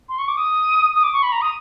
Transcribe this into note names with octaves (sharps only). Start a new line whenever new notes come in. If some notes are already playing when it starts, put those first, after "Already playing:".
C6
C#6
D6
D#6
D#6
D6
C#6
B5
A#5
D#6